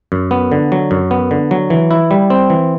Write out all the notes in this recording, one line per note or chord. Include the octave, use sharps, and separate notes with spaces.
F#2
B3
D3
F#3
F#2
B3
D3
F#3
E3
E4
G3
C4
E3